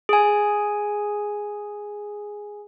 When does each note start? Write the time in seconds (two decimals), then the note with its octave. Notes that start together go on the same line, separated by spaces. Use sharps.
0.09 G#4 G#5